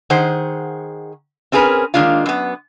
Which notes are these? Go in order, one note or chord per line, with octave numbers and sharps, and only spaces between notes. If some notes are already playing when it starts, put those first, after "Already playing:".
D#3 G#4 C5 F#5
C4 C#4 G#4 A#4 B4
D#3 G#3 A#3 D4 F4
F#2 B3